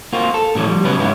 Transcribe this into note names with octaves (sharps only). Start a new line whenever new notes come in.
A#3 C4 F4 F#4
A4
A2 D3 E3 F#3 C#4 D4
F3 G3
C#3 F#3 B3 C#4 B4
G#2 E3 C#4 E4 G4